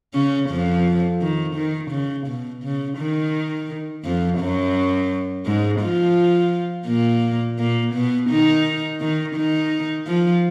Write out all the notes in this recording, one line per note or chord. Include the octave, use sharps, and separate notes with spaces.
C#3 C#4
F2 F3
D#3
D#3
C#3
B2
C#3
D#3
F2 F3
F#2 F#3
G#2 G#3
F3 F4
A#2 A#3
A#2 A#3
B2 B3
D#3 D#4
D#3 D#4
D#3 D#4
F3 F4